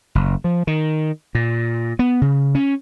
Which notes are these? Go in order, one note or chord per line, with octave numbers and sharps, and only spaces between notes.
F#1
F3
D#3
A#2
B3
C#3
C#4